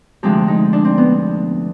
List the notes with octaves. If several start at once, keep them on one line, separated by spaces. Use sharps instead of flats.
D2 C3 F3 G#3 G4
D#4
D4
C4
B3